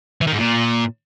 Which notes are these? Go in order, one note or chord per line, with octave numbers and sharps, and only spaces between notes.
E3
D#3
G#2
A#2